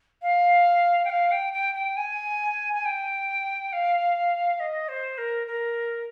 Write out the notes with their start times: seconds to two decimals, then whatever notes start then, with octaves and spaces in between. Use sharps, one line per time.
0.22 F5
1.05 G5
1.09 F5
1.31 G5
1.53 G5
1.75 G5
1.97 G#5
2.73 G#5
2.85 G5
3.73 F5
4.60 D#5
4.88 C5
5.18 A#4
5.47 A#4